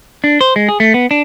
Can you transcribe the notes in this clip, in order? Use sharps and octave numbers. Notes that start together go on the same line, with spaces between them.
D4
C5
G#3
G#4
A3
B3
D4